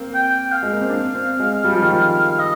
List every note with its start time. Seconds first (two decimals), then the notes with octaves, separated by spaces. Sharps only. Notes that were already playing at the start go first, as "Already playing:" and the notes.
Already playing: A#3 C4
0.15 G5
0.52 F5
0.63 G#3
0.72 A#3
0.81 C4
0.90 D4
1.15 C4
1.40 G#3
1.64 G3
1.73 F3
1.82 D#3
1.91 F3
2.39 D#5